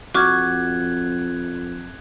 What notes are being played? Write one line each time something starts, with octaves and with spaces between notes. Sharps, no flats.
F2 F#4 C#6 D6 F6 F#6 G#6